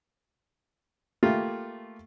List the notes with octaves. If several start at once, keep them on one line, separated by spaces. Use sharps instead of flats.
A3 A#3 F4 G4